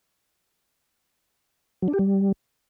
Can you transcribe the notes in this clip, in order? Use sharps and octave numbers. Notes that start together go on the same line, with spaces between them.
F#3
D4
G4
G3